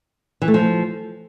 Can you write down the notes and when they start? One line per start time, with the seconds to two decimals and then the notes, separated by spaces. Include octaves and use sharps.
0.42 E3
0.48 A3
0.54 F3